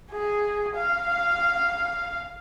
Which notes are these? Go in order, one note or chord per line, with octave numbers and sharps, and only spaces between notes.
G#4
F5